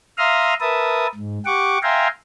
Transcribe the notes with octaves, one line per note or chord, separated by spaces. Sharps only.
E5 F5 A#5 C6 D#6 F6
A#4 B4 E5 A5 D#6
G#2
G4 F#5 C#6 D6
E5 F5 G5 G#5 A#5 C6